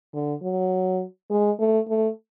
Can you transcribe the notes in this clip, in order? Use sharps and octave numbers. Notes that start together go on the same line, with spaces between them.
D3
F#3
G#3
A3
A3